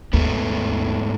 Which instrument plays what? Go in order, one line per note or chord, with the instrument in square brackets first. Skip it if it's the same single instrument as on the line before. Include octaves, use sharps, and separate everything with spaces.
[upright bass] D#2 [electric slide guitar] G#2 A3 B3